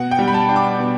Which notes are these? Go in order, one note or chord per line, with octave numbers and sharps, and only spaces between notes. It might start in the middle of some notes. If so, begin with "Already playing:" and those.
Already playing: B2 F#5
G5
G3
B5
A5
D4
D6
B2